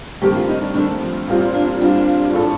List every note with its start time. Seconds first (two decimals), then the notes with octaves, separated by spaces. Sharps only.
0.22 G2 D#3 A3 C4 G4
0.35 F4
0.48 D#4
0.62 D4
0.74 G2 D#3 A3 C4 D4
1.01 F3
1.28 A#2 G3 C4 F4
1.54 D4
1.81 A#2 G3 C4 D4 F4
2.33 A2 A3 D4 A4